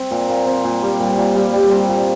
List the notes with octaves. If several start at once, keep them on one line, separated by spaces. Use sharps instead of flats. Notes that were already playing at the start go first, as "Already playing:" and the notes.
Already playing: C4
A#2
A#2
C4
A#2
G3
A#2
A#2
G3
G3
C4
A#2